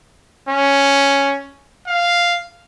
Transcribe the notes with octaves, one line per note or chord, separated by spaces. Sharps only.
C#4
F5